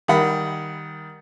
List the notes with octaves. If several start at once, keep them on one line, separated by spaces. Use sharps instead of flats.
D#3 G3 F#5 B5